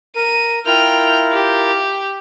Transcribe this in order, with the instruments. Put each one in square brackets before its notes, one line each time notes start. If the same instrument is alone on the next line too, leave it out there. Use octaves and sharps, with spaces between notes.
[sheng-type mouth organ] A#4 [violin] D#7
[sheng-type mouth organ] E4 F4 A#4 [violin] G5 F6
[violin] G4